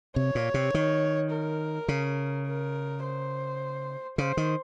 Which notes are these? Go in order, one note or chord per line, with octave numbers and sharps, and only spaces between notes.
C3 C#5
A#2
C3
D#3
A#4
C#3
A#4
C5
C#3 C5
D#3